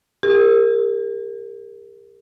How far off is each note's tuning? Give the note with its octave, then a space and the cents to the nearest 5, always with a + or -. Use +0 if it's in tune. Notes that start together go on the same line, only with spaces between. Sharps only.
G4 +40 A#4 -15